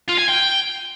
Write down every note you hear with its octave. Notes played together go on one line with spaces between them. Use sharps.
F4
G#5
G5